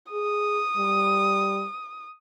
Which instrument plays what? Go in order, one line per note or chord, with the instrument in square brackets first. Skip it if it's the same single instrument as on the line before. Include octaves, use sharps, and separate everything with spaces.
[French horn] G#4 [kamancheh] D#6
[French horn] G3